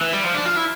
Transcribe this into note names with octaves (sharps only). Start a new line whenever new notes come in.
E3
G3
F3
D4
F4
E4